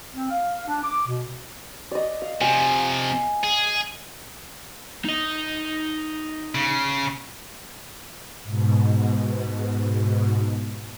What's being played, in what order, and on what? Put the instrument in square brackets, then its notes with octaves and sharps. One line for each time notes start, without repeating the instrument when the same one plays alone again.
[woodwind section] C4
F5
D4
D6
B2
[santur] D5 D#5
F5
[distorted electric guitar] C3 F3 [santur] G#5
[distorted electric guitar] G#4
[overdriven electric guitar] D#4 D#5
[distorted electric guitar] C#3
[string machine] G#2 B2